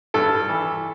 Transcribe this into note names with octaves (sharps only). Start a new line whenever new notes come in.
G2 A4
E3